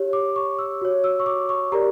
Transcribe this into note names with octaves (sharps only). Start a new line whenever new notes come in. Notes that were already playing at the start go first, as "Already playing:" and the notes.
Already playing: G4 C#5
D6
C#6
E6
F#4 C#5
E6
C#6
D6
C#6
G4 A#4 D5 A#5